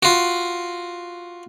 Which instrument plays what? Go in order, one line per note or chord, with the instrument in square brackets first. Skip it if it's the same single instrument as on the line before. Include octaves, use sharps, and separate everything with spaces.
[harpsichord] F4 F#4